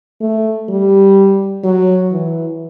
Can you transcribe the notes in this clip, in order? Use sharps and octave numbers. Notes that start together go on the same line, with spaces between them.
A3
G3
F#3
E3